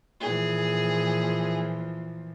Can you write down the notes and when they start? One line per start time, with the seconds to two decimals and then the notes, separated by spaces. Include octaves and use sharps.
0.21 A#2 E3 F3 G#4